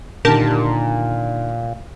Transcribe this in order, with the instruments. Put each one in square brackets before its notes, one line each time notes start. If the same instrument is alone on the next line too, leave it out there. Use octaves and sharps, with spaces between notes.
[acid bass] A#2 [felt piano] D3 D#3 [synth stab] G4 A#4 A5